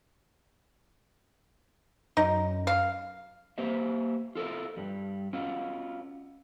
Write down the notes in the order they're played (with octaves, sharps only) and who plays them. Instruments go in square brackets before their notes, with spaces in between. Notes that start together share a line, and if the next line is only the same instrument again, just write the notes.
[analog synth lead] F#2 [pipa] D#4
[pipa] F5
[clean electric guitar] A#3 G4 C5 E5
F4 A4 A#4 E5
G2 G3
C#4 F4 F#4